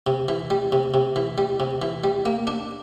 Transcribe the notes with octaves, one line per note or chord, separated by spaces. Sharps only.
C3
E3
G3
C3
C3
E3
G3
C3
E3
G3
A#3
D4